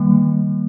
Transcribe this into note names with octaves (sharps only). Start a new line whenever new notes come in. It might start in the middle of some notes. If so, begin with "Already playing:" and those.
Already playing: D#3 G3 A#3